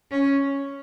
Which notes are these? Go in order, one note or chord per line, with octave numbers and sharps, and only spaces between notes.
C#4